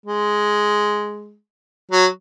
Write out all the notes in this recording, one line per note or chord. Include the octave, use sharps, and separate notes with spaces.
G#3
F#3